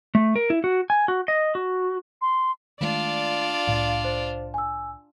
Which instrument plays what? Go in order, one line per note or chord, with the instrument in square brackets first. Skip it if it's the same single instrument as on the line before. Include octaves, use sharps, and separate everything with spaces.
[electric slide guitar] A3
A#4
E4
F#4
G#5
F#4
D#5
F#4
[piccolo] C6
[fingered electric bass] D#3 G#3 A3 [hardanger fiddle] D4 F4 [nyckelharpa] D5
[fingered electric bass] C2 A2 [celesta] F5
[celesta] C5
G#5 E6